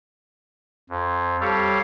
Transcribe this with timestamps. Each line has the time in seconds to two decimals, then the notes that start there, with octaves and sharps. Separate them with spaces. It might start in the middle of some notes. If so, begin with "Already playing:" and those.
0.90 F2
1.41 G3 G4 A4 C#5 F5